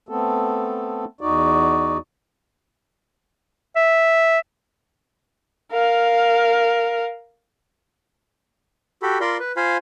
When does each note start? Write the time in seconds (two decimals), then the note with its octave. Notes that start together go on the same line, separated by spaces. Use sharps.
0.09 A3 B3 C4 A4
1.21 E2 D#4 F#4 D5
3.76 E5
5.72 A#4 F5
9.02 F#4 G4 A4 B5
9.21 F4 A#4 D5 B5 C6
9.40 B4
9.57 F4 C5 F5 G#5 B5